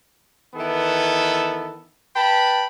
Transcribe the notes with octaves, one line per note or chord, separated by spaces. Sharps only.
D#3 E3 B3 A4
B4 G5 A5 B5